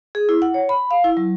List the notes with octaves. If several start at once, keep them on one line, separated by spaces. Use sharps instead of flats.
G#4
E4
F#5
C#5
B5
F5
E4
F#3